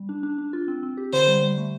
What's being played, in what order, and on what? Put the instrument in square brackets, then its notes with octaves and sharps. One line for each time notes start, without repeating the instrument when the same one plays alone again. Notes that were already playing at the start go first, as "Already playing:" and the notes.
Already playing: [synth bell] G3
D4
D4
D4
F4
C4
C4
G4
[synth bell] D3 [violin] C5
[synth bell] G3
G3
A3